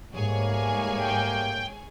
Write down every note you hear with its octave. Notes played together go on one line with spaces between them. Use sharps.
G#2 G3 A3 A#3 G#4 C#5 G#5
G5